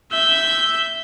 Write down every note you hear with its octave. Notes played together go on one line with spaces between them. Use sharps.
E5 G6